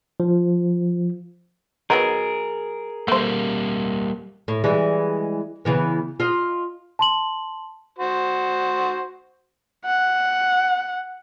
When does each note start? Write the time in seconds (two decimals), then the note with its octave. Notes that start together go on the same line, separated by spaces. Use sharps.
0.20 F3
1.90 F#3 B3 D#4 G#4 A#4
3.08 G3 A3 A#3 C5
4.48 A2
4.64 E3 G3 G#3
5.65 C#3 E3 B3
6.20 F4 D#5
6.99 A5 C6 F#7
7.98 F#4 C5
9.85 F#5